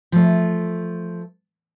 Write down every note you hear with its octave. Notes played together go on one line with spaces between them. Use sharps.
F3 A3